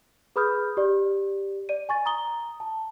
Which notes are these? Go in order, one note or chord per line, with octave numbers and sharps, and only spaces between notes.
G#4 B4 B5 D#6 F6 G6
G4 D5
D5 D#7
G#5 C#6 A6
A#5 D#6 G7
A5